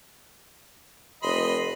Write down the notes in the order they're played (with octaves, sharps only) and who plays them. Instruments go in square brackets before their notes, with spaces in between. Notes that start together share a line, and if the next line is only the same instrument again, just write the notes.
[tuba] F1 [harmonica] D#5 B5 C6